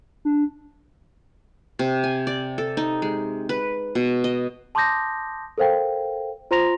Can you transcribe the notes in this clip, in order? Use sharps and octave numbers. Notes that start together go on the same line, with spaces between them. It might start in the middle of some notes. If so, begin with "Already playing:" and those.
D4
C3
G#5
D5
A4
D#4
G#3
B4
B2
D#5
A5 C6 D6 D#6 G6 A#6
A4 A#4 C5 F5 G5
F4 C5 A#5 C6 A#6 F7